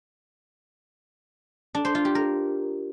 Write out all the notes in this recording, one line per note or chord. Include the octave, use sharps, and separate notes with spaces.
D4
C5
F4
G4
A#4